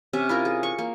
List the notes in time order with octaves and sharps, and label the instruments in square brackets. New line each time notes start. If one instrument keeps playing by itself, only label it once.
[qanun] C3 C#4 E5
E4 F4 A#4
G#4
C#6
A#3